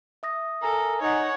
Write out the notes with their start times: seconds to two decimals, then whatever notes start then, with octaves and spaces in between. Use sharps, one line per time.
0.23 E5 D#6 A#6
0.63 A4 A#4 G#5 A#5
1.02 D#4 C#5 F#5